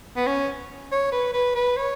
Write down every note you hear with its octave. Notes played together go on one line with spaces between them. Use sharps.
B3
C#4
C#5
B4
B4
B4
C#5